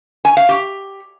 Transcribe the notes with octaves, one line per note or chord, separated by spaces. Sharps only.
G#5
F5
G4